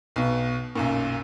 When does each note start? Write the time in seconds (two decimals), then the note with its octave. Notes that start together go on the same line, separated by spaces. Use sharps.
0.16 B1 B2
0.75 B1 F#2 A#2